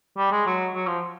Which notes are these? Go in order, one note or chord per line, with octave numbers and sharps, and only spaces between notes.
G3
G#3
F#3
F#3
F3